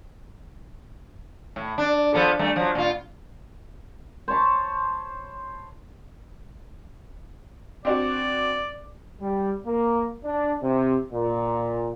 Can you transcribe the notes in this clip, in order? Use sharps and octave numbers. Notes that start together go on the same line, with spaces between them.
A2
D4
F3 B3 A4
G2 A3
F3 F#3
A#2 F4
C5 C#5 A5 B5
C4 D4 F#4 D5
G3
A#3
D4
C3
A#2